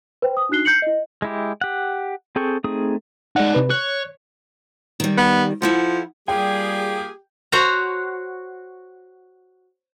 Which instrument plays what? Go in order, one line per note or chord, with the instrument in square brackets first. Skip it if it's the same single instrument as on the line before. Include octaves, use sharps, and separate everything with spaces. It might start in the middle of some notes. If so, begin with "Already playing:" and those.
[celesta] B4 C5 G5
D#6
D4 D#4 F#4 F#6 C7 G7
G6 C7 C#7 F#7
E4 D#5
[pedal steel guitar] G#3 E4 G4
G4 F#5
C4 G#4 A4 G5 C#6
A3 C4 D#4 G#4 D#6
[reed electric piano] G#3 F#5 [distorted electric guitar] D#4 D5
[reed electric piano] C3 B4
[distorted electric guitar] C#5 [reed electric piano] F#6
[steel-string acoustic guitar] D#3 G3
[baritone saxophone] B3
[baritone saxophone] F3 [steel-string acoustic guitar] E4 A4 F#5
[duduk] G3 [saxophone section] A#3 F4 G#4 [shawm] G4 [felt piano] G5
[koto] F#4 C5 C#5 F#5 A#5